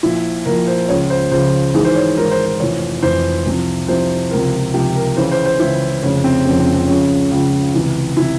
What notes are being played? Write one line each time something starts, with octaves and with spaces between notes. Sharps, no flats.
A#1 A#2 F3 E4
A#1 A#2 F3 A#4
C5
C#2 C#3 F3 C#5
C5
C#2 C#3 F3 C5
G#1 G#2 E3 G#4
C5
C#5
G#1 G#2 E3 A#4
C5
C5
F1 F2 E3 C#5
F1 F2 E3 C5
C2 C3 F3
C2 C3 F3 C5
C#2 C3 F3 A#4
C#2 C3 F3 G4
A#4
C#2 C#3 E3 C5
C5
C5
C#2 C#3 E3 E4
F1 F2 C#3 C#4
C4
F1 F2 C#3 C#4
C4
C4
C#2 C#3 F3 C#4
C#2 C#3 F3
C#2 C3 E3
C3 E3 E4